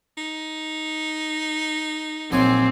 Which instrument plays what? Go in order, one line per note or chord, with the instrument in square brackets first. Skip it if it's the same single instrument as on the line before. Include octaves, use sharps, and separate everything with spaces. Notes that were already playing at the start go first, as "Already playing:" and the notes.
[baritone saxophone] D#4
[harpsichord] A#1 F#3 G#5 [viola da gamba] C4